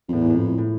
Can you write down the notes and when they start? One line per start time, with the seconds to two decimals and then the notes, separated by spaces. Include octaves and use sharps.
0.09 F2
0.13 E2 A2
0.21 G#2
0.30 A2
0.36 F2
0.58 A2